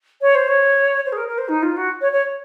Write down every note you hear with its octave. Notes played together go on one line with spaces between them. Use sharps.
C#5
C5
C#5
C5
G#4
A#4
A#4
C5
D#4
F4
F#4
C#5
C#5